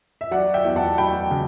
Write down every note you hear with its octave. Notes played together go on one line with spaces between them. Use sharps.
E5
F#3 D5 F#5
E5 G5
E2
F#5 A5
F#3 G5 B5
C#3